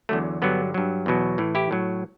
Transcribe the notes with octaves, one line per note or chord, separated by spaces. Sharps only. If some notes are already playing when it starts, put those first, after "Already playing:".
E2 D3 F#3 A3
G2 D3 F#3 B3
G2 F#3
E2 B2 F#3
A2 E3
E4 G4
A2 F#3